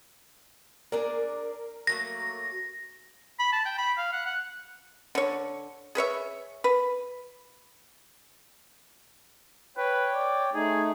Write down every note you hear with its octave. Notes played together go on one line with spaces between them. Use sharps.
D4 G#4 A#4 D5
F#3 A3 A#3 A#6
B5
A5
G5
B5
F5
F#5
F#5
D3 C#5
G#4 B4 C#5 E5
B4
B4 C#5 G5
D5
A3 D#4 G#4